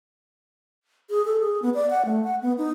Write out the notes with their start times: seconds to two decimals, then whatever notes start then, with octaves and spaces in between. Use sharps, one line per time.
1.10 G#4
1.25 A4
1.40 G#4
1.62 B3
1.74 D5
1.90 F#5
2.05 A3
2.24 F#5
2.42 B3
2.58 D#4